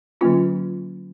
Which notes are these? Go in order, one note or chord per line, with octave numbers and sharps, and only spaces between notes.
D3 F#3 A#3 C#4 F4